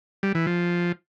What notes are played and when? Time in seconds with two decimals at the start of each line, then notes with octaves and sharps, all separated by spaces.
0.23 G3
0.35 E3
0.47 F3